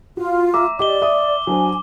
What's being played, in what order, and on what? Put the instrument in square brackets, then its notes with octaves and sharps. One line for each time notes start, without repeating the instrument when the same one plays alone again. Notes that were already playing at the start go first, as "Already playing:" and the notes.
[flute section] F4 [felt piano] F#4
[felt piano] E5 A#5 E6 [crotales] D6
[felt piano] G4 D#5 [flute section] D5 [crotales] D6 G7
[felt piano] E5 D#6
[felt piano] F#3 D4 C5 [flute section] G#5